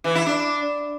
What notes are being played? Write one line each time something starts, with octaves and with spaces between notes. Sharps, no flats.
E3
E4
D4